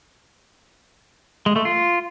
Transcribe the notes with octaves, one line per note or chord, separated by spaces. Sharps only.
G#3
A3
F4